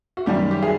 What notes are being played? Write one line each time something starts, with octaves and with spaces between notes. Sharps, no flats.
F#4
F#2 D#3 G3 G4
G4
G#4